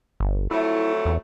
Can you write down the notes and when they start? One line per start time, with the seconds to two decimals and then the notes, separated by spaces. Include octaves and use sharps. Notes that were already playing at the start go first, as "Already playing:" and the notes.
0.20 G1
0.51 F2 F#3 A3 E4
1.05 E2